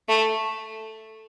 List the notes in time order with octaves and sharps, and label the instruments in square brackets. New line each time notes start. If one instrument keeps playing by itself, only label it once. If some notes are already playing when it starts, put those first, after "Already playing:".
[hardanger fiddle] A3